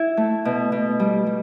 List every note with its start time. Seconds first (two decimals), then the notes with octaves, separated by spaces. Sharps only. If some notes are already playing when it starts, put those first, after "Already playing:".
Already playing: E4
0.17 A3
0.45 B2
0.72 B2
1.00 G3
1.27 G3